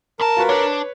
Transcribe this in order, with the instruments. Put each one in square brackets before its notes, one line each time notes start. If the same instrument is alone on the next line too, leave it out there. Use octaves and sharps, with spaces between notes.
[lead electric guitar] D2 A5 [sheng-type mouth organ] A#4
[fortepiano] F4 F#4 B4
[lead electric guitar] D4 [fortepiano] B4 C#5